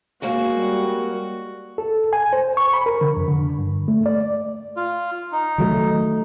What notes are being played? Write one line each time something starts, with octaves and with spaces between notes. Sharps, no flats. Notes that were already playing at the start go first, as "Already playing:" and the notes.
F#3 G#3 A#3 F#4
G3
A4
G#5
C5
C#6
B5
A#4
D3
F2
D3
G2
A3
D5
F4
D#4
D#3 F#3 A3